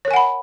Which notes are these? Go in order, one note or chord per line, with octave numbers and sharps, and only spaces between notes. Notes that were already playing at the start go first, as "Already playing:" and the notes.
A#4 C#5 F#5 G#5 B5